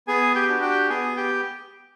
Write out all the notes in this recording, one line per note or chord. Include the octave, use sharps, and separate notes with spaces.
B3 G#4 G#5
G4 G5
D4 F#4
G4 G5
B3 G#4 G#5
G4 G5